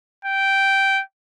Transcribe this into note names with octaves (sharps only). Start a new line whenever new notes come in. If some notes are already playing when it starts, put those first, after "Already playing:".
G5